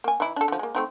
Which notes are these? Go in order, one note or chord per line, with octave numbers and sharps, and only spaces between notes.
A#3 G#5
E3 D#4 E4
D4 A4
D3 F3
G#3 A#3
A3 C4 D#4